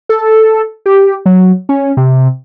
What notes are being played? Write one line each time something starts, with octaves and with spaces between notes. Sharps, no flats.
A4
G4
F#3
C#4
C3